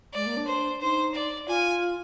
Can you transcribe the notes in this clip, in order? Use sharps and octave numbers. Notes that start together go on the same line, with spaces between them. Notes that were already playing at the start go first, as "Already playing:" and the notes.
G#3 D5
A#3
D4
C5
D#4 C5
D5
F4 G#5